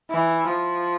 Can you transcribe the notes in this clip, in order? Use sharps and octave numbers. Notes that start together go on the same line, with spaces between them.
E3
F3